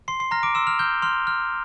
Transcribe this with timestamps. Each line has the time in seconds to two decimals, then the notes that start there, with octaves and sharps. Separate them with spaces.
0.08 C6 C7
0.20 C6 C7
0.31 A#5 F6 A#6
0.43 D6 D7
0.55 C6 E6 E7
0.67 F6 F7
0.79 F6 G6 G7
1.02 C6 F6 F7
1.27 F6